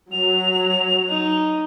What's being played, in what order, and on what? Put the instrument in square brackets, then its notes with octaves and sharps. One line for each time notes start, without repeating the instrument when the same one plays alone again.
[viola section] F#3 [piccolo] F7
[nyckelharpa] D#4